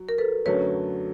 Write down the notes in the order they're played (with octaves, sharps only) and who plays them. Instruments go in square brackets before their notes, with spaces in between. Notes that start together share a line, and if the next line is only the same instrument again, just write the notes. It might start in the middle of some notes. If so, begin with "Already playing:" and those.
Already playing: [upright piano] F#3
[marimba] A#4
A4 B4
[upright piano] F#2 D3 F#3 A3 [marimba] B4 C#5